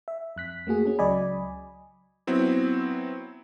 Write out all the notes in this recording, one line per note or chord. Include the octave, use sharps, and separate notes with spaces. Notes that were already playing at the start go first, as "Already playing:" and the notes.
E5
F2 F#6 B6
A3 A#3 F#4 G#4
C#4 G#4
C#2 F#3 D5 D#5 G#5 B5
F#3 B3 C4 E4